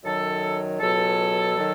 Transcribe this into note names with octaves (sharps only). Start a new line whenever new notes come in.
F#2 D#3 F#3 A4
C#2 B2 F#3 A4
D#3 F#3